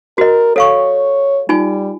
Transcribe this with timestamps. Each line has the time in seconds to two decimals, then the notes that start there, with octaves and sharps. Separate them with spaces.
0.18 F#4 A#4 D#5
0.56 A4 C#5 F5 C#6
1.49 G3 D#4 F4 G#5